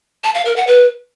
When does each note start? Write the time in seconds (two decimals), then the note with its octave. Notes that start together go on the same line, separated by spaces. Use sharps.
0.24 A5
0.34 F5
0.45 A#4
0.56 F#5
0.67 B4